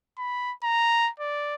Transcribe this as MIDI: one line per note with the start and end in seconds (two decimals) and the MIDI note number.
0.18 0.53 83
0.63 1.10 82
1.20 1.55 74